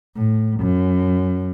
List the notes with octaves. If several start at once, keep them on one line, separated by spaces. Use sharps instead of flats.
A2
F#2